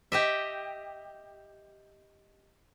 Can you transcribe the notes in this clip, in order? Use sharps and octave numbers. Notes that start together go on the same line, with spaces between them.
G4 D#5 E5